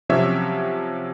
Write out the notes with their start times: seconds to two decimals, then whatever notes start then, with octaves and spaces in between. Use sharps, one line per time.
0.09 C3 F3 F#3 C#4 C#5 E5